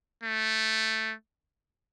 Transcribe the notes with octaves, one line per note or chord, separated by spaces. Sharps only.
A3